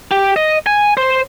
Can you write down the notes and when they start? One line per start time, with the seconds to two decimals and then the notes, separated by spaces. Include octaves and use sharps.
0.11 G4
0.36 D#5
0.66 G#5
0.97 C5